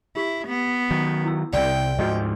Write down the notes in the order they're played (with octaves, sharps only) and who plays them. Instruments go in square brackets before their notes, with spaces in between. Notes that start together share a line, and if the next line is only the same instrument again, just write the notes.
[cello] E4 [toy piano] G4
[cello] B3
[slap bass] D#3 F#3
[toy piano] E4 A#5 E6
[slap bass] C2 C3 [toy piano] D5 [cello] G5
[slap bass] D2 G#2 F3 [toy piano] F#4 D#5